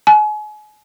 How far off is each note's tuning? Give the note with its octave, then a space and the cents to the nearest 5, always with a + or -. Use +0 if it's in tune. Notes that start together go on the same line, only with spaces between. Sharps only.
G#5 +35